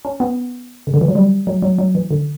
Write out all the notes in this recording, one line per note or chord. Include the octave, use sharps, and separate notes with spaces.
C#4
B3
C#3
D3
E3
F#3
G3
F#3
F#3
F#3
E3
D3